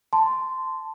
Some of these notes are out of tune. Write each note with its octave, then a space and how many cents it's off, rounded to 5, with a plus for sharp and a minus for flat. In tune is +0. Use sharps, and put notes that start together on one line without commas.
A5 +0 C6 -15